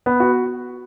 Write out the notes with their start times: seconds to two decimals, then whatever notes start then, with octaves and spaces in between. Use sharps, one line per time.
0.06 B3
0.20 F#4